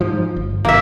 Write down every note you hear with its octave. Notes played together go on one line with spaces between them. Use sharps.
G#2 F3
G1
G#1 C3 A#3 E5